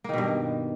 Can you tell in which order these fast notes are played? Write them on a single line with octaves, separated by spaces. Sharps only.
A#3 D#3 B2 G2